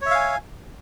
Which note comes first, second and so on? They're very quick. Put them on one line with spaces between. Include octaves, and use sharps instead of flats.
C#5 E5 F5 G#5